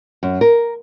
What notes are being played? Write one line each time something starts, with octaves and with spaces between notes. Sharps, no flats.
F#2
A#4